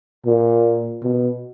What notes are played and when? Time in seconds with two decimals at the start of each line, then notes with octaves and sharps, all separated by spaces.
0.26 A#2
1.03 B2